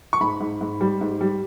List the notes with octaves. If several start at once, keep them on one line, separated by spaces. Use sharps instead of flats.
C#6
G#2 B5
G#2
G#2
G3
G#2
G3